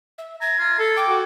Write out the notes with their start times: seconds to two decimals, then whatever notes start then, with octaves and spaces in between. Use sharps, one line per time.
0.18 E5
0.41 A#5 G#6
0.59 F4
0.79 A4 A5
0.96 G5 D6
1.08 F#4